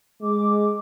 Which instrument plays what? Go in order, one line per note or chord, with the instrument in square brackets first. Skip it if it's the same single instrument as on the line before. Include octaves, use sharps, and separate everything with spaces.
[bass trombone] G#3 [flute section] D6